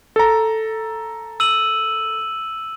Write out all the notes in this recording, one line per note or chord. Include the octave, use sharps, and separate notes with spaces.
A4 A#5
E6 D#7 F#7